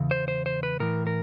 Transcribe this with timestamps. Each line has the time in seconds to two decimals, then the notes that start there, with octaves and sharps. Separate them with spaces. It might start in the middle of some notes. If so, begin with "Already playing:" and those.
Already playing: E2 C#3
0.11 C5
0.28 C5
0.46 C5
0.63 B4
0.80 A2 E3 A#4
1.07 A#4